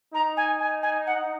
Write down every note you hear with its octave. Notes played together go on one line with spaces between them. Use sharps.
D#4 A#5
G#5
G#5
G#5
F#5